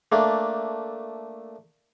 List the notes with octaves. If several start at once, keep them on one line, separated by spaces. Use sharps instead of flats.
A3 A#3 D4